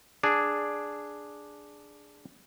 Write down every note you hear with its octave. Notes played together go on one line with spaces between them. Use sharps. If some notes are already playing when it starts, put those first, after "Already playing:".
D4 G#4